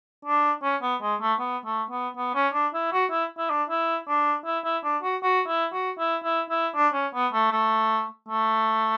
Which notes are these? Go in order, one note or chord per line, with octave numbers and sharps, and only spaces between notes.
D4
C#4
B3
G#3
A3
B3
A3
B3
B3
C#4
D4
E4
F#4
E4
E4
D4
E4
D4
E4
E4
D4
F#4
F#4
E4
F#4
E4
E4
E4
D4
C#4
B3
A3
A3
A3